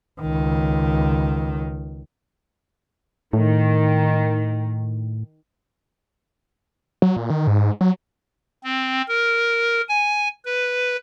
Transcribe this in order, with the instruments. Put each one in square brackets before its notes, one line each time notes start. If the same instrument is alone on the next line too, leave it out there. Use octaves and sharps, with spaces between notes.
[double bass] C#2 D#3
[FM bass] A2 [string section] D#3
[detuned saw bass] F#3
A#2
D#3
G#2
F#3
[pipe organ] C4
A#4
G#5
B4